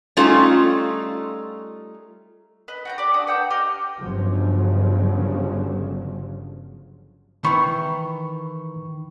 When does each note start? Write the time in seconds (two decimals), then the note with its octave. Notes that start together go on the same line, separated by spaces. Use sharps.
0.17 G3 A3 C#4 D#4 F4 A4
2.68 B4 D#5
2.85 F#4 G5 A#5
2.98 G4 D5
3.14 D4 F#4 D#6
3.27 B4 F#5 G5 A5
3.50 G4 D#5 F6 G6
4.01 G1 G2 C#3 F3 F#3
7.44 D#3 E3 B5 C#6